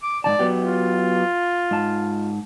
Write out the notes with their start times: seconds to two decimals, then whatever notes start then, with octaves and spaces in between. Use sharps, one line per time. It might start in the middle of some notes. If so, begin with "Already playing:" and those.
0.03 D6
0.24 G#2 C#3 D5 A5
0.39 F#3 B3 G4
0.61 F4
1.71 G#2 A5